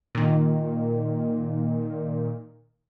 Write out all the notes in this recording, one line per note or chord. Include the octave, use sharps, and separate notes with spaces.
A#2 D#3